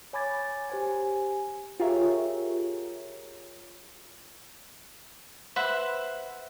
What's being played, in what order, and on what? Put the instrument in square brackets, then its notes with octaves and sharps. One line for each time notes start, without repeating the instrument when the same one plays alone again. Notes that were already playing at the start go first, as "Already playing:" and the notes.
[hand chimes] C#5 G#5 B5 D6 G#6 A6
G4 C5 G#5
[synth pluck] F4 G4 G#4 A#4 C#5 E5
[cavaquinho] B4 C5 E5 F#5